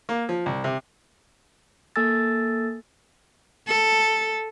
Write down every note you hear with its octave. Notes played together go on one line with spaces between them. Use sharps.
A#3
F3
C2
C3
A#3 A4 G#5 E6 A6
A4